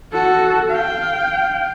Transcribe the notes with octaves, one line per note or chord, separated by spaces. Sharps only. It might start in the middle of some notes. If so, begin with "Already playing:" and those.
F#4 A4
F5 G5